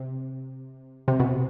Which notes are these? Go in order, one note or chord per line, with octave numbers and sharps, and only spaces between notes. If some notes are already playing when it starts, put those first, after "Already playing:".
Already playing: C3
C3
B2